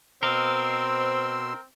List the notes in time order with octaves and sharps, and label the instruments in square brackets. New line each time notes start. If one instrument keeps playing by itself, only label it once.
[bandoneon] B2 C6 E6 [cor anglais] C4 [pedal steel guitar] A#4 D#5 F5 [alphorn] C5